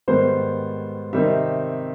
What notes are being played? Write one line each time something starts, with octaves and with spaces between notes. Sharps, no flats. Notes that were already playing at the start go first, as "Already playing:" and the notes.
G#2 D#3 G3 B3 C5
C3 D#3 G3 C4 D#4 E5